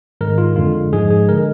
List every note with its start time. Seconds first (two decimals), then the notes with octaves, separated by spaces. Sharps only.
0.21 G#2 D#3 G#3 A#4
0.38 F4
0.56 F2 D3 G#3 F4
0.92 G#2 F3 G#3 G#4
1.10 G#4
1.29 D3 G#3 A#4